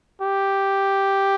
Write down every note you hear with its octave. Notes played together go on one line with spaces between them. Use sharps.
G4